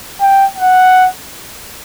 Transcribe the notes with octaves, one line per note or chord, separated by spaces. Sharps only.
G5
F#5